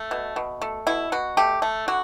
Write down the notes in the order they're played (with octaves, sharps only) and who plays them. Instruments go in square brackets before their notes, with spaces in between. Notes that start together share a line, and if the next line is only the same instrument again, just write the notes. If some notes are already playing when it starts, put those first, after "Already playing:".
Already playing: [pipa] A3
B2
B2
A3
B2 E4
B2 F#4
A3 G4
A3
D3 F#4